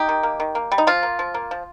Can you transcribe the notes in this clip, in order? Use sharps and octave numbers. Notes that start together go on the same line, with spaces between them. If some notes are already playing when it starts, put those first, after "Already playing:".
Already playing: D#4 G4
D#3
A#3
D#3
A#3
G3
D#4
F3 F4
A#3
F3
A#3
F3